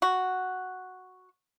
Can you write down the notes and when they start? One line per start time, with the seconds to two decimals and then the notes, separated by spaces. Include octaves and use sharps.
0.02 F#4